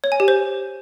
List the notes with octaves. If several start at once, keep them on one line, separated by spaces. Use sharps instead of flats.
C#5
G#5
G4
C5